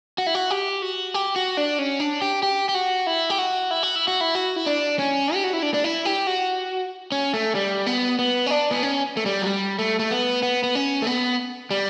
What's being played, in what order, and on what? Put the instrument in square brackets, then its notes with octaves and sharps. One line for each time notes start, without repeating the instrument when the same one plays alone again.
[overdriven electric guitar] F#4
E4
F#4
G4
F#4
G4
F#4
D4
C#4
D4
G4
G4
G4
F#4
E4
G4
F#4
E4
F#4
E4
F#4
E4
F#4
E4
D4
C#4
G4
F#4
E4
D4
D4
E4
G4
F#4
C#4
A3
G3
B3
B3
C#4
D4
B3
C#4
A3
G3
F#3
G3
A3
A3
B3
B3
B3
C#4
A3
B3
G3